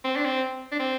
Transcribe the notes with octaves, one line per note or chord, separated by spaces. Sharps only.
C4
D4
C4
D4
C4